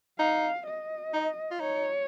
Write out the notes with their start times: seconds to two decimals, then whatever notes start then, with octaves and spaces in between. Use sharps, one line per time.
0.19 D#4 F5
0.66 D#5
1.14 D#4
1.51 F4
1.60 D#4 C#5